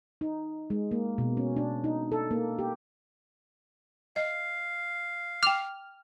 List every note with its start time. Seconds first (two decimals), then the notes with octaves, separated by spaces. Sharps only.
0.21 D#4
0.70 G#3
0.91 A#3
1.18 B2
1.37 C#4
1.56 D4
1.84 D#4
2.12 A4
2.31 A#3
2.59 G4
4.16 D#5 F5
5.43 G5 D6 F6